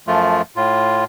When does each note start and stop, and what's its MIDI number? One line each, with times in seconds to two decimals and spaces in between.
0.07 0.42 42
0.07 0.42 53
0.07 0.42 57
0.07 0.42 65
0.56 1.04 45
0.56 1.04 65